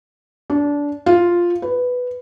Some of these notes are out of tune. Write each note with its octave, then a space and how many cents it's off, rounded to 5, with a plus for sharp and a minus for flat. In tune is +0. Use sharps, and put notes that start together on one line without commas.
D4 -20
F4 +0
B4 +5